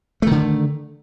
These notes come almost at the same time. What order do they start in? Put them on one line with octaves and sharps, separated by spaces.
A3 D#3 D3